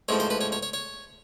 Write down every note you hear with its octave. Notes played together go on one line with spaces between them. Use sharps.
A1 G#2 F3 C#5
C5
B4
C#5
C#5
C#5
C#5